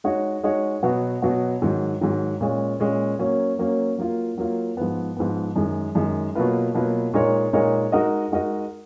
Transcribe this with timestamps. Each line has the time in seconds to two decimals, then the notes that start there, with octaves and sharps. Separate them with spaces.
0.04 G#3 D#4 F#4 C#5
0.44 G#3 D#4 F#4 C#5
0.83 B2 F#3 B3 F#4
1.22 B2 F#3 B3 F#4
1.62 G#2 D#3 F#3
2.01 G#2 D#3 F#3
2.41 A#2 G#3 C#4
2.80 A#2 G#3 C#4
3.19 F#3 A#3 C#4
3.59 F#3 A#3 C#4
3.98 F#3 A#3 F4
4.38 F#3 A#3 F4
4.77 G#2 F3 B3
5.17 G#2 F3 B3
5.56 F#2 D#3 G#3
5.95 F#2 D#3 G#3
6.35 B2 F#3 A#3 F4 B4
6.74 B2 F#3 A#3 F4 B4
7.14 A#2 G#3 D#4 A#4 C#5
7.53 A#2 G#3 D#4 A#4 C#5
7.92 G#3 D#4 F#4 A#4 D#5
8.32 G#3 D#4 F#4 A#4 D#5